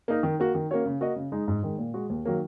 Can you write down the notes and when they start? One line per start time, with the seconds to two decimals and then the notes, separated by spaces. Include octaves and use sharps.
0.08 A#3 D#4 A#4
0.23 D#3
0.40 A#3 F#4
0.55 D#3
0.71 A#3 C#4 F#4 C#5
0.86 C#3
1.01 A#3 F#4 D#5
1.16 C#3
1.32 G#3 D#4
1.48 G#2
1.63 D#3 G#3
1.78 A#2
1.94 G#3 F#4
2.10 D#2
2.25 D#3 F#3 A#3